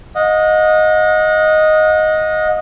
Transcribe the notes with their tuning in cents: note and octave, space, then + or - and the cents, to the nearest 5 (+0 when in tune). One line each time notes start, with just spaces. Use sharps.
D#5 +0 F#5 -40